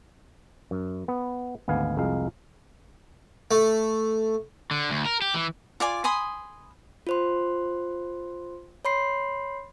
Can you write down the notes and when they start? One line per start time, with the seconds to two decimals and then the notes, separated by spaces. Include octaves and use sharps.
0.71 F#2
1.08 B3
1.68 G#1 D2 B3 F5 G#5
1.97 C2 F2 G#3 F5
3.51 A3
4.71 D3
4.90 D2
5.06 A#4
5.22 G4
5.34 E3
5.80 F4 D5 G#5
6.04 G#5 B5 C6 D#6
7.07 F4 C5 C6
8.85 C#5 B5 C6 C7